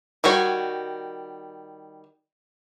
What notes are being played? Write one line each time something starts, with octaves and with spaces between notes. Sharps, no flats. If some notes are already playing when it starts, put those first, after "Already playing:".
D#3 G3 F#4 C#5